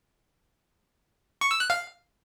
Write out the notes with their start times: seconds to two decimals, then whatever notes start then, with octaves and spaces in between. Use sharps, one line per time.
1.41 C#6
1.51 E6
1.60 F#6
1.70 F5